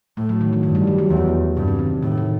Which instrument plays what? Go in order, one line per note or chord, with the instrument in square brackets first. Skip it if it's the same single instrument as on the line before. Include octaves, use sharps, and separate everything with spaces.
[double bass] A2 [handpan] A3
[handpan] F#3
D#3
E3
[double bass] G2 [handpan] D#3
[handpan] G3
F#3
F#3
[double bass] E2 [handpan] E3
[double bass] G2 [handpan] C3
[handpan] C3
D#3
[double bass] A2 [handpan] D#3
[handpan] D#3